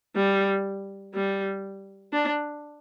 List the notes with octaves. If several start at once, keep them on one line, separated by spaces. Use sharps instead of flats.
G3
G3
D4